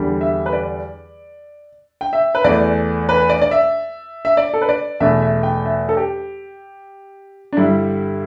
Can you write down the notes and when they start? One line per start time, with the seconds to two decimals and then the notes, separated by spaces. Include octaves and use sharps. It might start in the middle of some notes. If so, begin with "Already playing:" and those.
Already playing: E2 D3 G3
0.21 E5
0.46 B4
0.53 D5
2.01 G5
2.13 E5
2.35 B4
2.44 E2 E3 A3 D5
3.09 B4
3.29 D5
3.42 D5
3.51 E5
4.25 E5
4.37 D5
4.54 A4
4.61 B4
4.69 D5
5.00 E2 B2 A3 E5
5.22 E5
5.43 G5
5.65 E5
5.89 A4
5.97 G4
7.52 D4
7.57 G2 D3 G3 E4